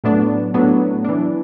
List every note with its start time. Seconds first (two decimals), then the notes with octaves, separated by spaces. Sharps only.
0.04 A2 F#3 B3 D4
0.54 A2 F#3 B3 D4
1.05 E3 D4